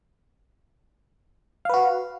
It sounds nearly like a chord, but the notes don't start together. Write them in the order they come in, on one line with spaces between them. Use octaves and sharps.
F5 B4 F#4